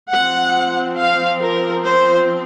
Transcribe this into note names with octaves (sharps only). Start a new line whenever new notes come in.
C4 F#5
F3
F5
A#4
C5